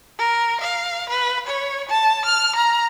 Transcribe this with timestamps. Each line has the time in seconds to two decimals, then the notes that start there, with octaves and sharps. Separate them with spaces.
0.19 A#4
0.60 F5
1.09 B4
1.47 C#5
1.89 A5
2.25 F6
2.55 A#5